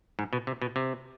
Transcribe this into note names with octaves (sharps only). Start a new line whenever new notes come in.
G#2
B2
C3
B2
C3